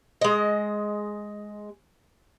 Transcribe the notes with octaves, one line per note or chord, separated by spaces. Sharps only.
G#3 D#5